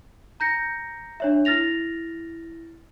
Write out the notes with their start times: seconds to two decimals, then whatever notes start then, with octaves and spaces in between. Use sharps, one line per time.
0.40 A#5 G6 A#6 C#7
1.20 D4 C#5 E5
1.45 E4 F6 A6 A#6 F7